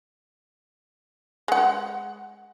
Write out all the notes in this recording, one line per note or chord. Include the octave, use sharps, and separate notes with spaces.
G#3 F#5